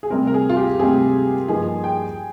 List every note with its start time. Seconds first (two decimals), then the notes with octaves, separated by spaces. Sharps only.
0.03 G#4
0.10 D2 C3 G3 C4 A#4
0.27 A#4
0.34 G#4
0.49 F4
0.57 G4
0.79 D2 C3 G3 C4 G#4
1.48 G2 F3 A#3 D#4 G#4
1.84 G5